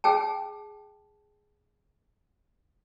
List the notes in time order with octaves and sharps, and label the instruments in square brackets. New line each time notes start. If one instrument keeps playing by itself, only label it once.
[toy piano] G#4 G5 A5